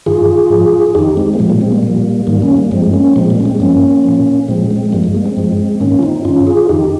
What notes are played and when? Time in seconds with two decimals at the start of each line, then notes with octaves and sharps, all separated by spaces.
0.06 G2 D#3 F4 G#4
0.50 G#2 F3
0.87 G#4
0.95 F2 D#3 D#4 G4
1.17 G#3 C4
1.34 A#3
1.39 A#2 F3 G#3
1.50 G3 A#3
1.61 G#3 C4
1.72 G3 A#3
1.83 A#2 F3
2.27 G#2 D#3 G3 A#3
2.42 A#3 C#4
2.57 G3 A#3
2.71 G2 F3 G#3 C4
2.93 A#3 C#4
3.16 A#2 F3 G#3 C4
3.30 G3 A#3
3.40 C#4
3.45 G#3 C4
3.60 G2 F3 A#3 C#4
4.04 A#2 F3
4.48 A#2 F3 G#3 C4
4.70 G#3 C4
4.85 G#3
4.92 G2 F3 G3 A#3
5.04 G#3
5.14 G3 A#3
5.25 G#3 C4
5.37 G2 F3
5.80 G#2 D#3 A#3 C#4
5.99 F4
6.03 C4 D#4
6.25 G2 D#3 C#4 F4
6.47 F4 G#4
6.69 F2 D#3 D#4 G4